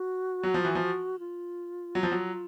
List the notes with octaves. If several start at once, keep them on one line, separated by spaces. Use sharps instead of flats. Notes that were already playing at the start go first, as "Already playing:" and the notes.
Already playing: F#4
F#3
F3
E3
F3
F4
F#3
F3
F#3